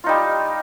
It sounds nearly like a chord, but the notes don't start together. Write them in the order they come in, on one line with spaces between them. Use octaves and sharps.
F4 D#4 G3